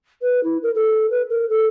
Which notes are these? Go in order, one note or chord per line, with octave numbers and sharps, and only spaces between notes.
B4
E4
A#4
A4
B4
A#4
A4